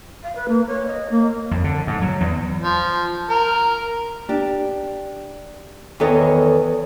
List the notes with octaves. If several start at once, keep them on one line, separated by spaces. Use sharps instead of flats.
F5
B4
A#3
C#5
D#5
A#3
F2
D3
G#2
F#3
E2
F3
A#4
D4 G4
E2 D#3 A4 B4 C#5 D#5